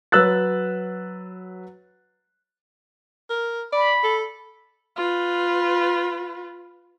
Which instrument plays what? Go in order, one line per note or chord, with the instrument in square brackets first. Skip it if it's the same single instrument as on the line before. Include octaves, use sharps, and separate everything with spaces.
[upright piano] F#3 B4 E6 F#6 A6
[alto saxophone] A#4
[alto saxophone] D5 [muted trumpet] B5
[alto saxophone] A4
[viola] F4 B4